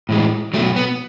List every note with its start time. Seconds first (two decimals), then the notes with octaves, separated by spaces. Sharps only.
0.09 A2 E3 G#3
0.54 F#3 A3
0.58 B2
0.76 B3